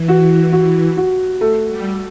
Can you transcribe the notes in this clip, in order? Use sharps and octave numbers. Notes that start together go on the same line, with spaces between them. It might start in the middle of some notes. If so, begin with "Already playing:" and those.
Already playing: E3
F#4
F#4
F#4
A3
G3